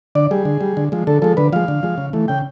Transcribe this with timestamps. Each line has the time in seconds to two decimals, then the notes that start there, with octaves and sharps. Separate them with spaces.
0.15 D3 D5
0.31 G3 G#4
0.45 D3
0.61 G3
0.77 D3
0.92 F3 G#3
1.07 D3 A4
1.22 F3 G#3 A4
1.37 D3 B4
1.53 F3 G#3 F5
1.68 D3
1.83 F3 G#3
1.98 C#3
2.13 E3 A3
2.28 C#3 G5